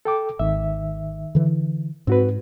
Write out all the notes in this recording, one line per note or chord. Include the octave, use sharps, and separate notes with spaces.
A4 G5 D6
G#1 D#3 E5
D3 E3
G#2 C4 F#4 B4